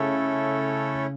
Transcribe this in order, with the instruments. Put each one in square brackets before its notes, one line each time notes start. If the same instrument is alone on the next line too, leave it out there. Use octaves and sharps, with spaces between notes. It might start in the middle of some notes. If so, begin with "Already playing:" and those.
Already playing: [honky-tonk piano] C#3 [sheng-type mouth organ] A3 C#4 E4 A4 C#5